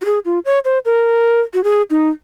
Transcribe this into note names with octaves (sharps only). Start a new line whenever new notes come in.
F#4
G#4
F4
C#5
C5
A#4
F#4
G#4
D#4